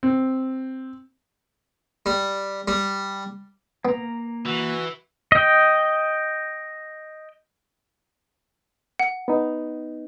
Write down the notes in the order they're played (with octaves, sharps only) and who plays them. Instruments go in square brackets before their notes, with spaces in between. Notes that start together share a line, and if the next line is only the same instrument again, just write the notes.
[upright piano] C4
[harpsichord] G3
G3
[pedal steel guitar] A#3 A#5 [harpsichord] B3
[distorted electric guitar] E3 [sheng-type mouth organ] F#4
[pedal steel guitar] D#5 G5
[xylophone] F#5
[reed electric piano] B3 D#4